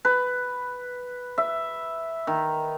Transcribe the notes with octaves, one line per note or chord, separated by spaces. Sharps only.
B4
E5
D#3